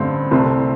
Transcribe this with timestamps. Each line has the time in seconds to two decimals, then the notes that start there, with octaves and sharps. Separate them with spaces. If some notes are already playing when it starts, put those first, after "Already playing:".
Already playing: A1 G2 D3 A3 C4
0.31 C2 C3 A3 C4